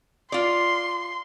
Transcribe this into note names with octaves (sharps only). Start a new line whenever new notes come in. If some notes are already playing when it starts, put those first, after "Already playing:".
F4 D5 C6